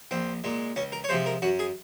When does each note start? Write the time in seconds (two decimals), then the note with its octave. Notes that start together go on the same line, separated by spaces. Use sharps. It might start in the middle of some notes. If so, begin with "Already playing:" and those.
0.11 A#1 C4
0.44 A#2 G#3
0.76 C#2 C#4
0.92 A#4
1.04 C#5
1.09 C3 F3 G#3 C5
1.26 A#4
1.42 F#2 F#4
1.59 G#4